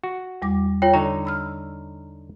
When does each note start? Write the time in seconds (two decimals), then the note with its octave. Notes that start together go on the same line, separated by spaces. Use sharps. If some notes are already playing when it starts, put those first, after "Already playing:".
0.04 F#4
0.42 E2 G3 D6
0.82 F4 C#5 G5
0.94 D3 D#4 C#5 A#5
1.25 B5 E6 F6